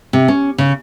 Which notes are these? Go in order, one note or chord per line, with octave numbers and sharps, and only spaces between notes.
C3
C#4
C#3